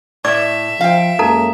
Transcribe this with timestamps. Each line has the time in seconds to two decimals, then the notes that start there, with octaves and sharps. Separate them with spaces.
0.25 A2 D5 E5 D6
0.81 F3 F5 G5
1.19 F#2 G#3 A#3 D#4 A4 A#5